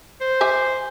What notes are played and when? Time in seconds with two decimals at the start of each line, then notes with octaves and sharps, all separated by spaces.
0.21 C5
0.41 G4 E5 G#5